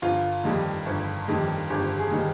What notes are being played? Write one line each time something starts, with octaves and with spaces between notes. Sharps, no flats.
G1 F4
F2 D#3 G3
G1
F2 D#3 G3
G1 G4
G#4
D#3 G3